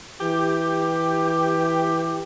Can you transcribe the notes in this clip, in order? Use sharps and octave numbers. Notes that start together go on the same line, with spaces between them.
E3 G4